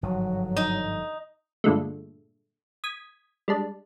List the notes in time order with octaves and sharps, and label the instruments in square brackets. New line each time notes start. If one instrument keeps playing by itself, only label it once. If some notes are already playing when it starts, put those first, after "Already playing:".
[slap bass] G1 G#2 F3 [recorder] F#3
[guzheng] D#4
[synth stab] G2 A#2 D3 G#3 A3
D#6 G#6 B6
G3 G#3 D4